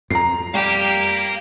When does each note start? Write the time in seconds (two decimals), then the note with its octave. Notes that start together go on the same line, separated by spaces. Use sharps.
0.11 F2 A#5 C7
0.54 G3 G4 F5 A#5